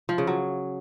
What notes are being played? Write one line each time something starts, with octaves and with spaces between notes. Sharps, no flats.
F3
C#3
F#3